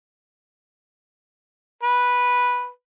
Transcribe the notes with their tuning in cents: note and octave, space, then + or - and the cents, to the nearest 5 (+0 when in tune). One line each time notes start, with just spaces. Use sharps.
B4 -5